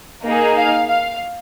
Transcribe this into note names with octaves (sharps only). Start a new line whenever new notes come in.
A#3 D#4 G#4
F5
F5